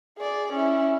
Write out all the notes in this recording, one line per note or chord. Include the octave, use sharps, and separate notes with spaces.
G#4 D5
C#4 E4